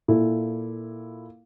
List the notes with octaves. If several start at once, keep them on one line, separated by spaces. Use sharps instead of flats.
A#2 E4 A4